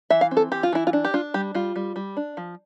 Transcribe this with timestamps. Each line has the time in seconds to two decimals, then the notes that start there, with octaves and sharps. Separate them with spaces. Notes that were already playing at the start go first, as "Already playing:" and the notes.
0.10 E3 E5
0.21 F5
0.31 C4
0.37 A4
0.52 E3 G4
0.63 F4
0.72 E3 E4
0.87 F4
0.93 D4
1.05 G4
1.14 D4 F4
1.34 G3 G4
1.55 G3 F4
1.76 G3
1.96 G3
2.17 D4
2.37 F3